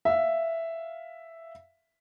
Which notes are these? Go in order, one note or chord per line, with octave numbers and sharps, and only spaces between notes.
E5 F5